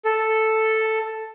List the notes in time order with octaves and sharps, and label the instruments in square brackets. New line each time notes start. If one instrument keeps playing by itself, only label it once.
[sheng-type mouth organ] A4